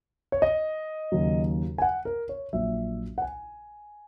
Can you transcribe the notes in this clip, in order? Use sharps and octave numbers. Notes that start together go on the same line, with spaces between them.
C#5
D#5
D#2 C#3 F#3
G#5
F#5
A#4
C#5
A#1 A#2 F#3 E5
F#5
G#5